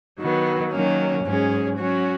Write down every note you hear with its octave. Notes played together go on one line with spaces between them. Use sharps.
D#3 F#3 B3
D#3 F#3 A#3 C#4
G#2 F#3 C#4 G#4
F#3 C#4 F#4